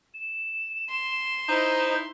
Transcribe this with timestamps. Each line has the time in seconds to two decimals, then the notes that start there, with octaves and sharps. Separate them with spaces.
0.14 E7
0.89 C6
1.49 D#4 E4 C5